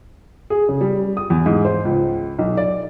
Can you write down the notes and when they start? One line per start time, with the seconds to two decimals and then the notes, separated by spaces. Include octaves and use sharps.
0.50 G#4
0.69 C#3
0.81 G3
1.17 D#6
1.30 E2
1.46 G#2
1.65 C5
1.85 C#2
2.39 B1
2.57 D5